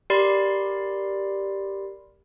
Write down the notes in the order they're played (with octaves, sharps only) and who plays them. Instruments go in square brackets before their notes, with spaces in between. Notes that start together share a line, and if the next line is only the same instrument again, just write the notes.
[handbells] G4 A#4 D5 B5 C6 C7